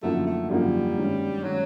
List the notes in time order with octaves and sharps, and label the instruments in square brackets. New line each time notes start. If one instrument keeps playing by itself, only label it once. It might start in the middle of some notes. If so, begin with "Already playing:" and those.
[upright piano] F#2 D3 F3 A#3 D#4 [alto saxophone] A3
[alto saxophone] A3
[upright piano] F#2 D3 F3 A#3 D#4 [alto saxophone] G3
[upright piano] G2 D#3 G#3 C#4
[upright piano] D#3 G#3 C#4 [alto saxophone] F#3